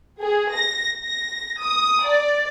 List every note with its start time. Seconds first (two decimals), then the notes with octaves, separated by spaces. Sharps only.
0.23 G#4
0.54 A#6
1.01 A#6
1.60 D#6
2.06 D5